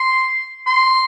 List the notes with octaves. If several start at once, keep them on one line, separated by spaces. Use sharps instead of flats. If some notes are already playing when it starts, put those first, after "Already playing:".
Already playing: C6
C6